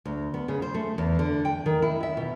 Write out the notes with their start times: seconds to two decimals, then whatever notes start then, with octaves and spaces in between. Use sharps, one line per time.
0.05 D2
0.34 B3
0.48 C#3
0.62 C5
0.74 A3
0.98 E2
1.19 D3
1.45 G5
1.66 D#3
1.82 E4
2.03 E5
2.17 B2